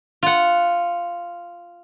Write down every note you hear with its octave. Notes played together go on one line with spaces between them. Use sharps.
F4 F#5